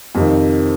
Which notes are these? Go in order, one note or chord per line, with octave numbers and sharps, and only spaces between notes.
F2 C3 D#3